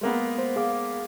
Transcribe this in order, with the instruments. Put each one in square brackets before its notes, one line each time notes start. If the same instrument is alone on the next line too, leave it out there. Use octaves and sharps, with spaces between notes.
[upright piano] G#3 A#3 B3
[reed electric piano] C5
G#4 F5 D6